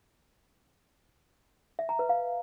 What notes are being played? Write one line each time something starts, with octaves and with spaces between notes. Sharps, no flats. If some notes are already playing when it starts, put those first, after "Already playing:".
E5
A#5
B4
F5